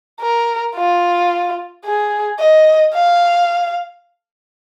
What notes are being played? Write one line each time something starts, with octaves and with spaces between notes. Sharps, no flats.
A#4
F4
G#4
D#5
F5